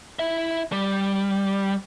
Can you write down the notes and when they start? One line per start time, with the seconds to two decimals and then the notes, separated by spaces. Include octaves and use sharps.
0.19 E4 E5
0.72 G3